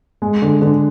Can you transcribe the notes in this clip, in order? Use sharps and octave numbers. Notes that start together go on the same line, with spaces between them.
G#3
D3
D3